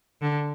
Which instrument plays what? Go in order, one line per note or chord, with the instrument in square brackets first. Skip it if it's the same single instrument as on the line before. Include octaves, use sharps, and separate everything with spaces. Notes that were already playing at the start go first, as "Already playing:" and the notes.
[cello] D3